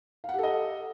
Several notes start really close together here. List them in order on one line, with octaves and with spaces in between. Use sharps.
F5 F#5 G4 A4 D#5